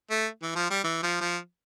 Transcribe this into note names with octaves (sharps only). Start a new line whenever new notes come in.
A3
E3
F3
G3
E3
F3
F3